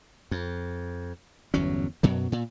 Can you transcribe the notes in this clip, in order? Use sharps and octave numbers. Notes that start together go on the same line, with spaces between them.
F2
G1 E2 F#3 C#4
F#2 B2 F#3
A#2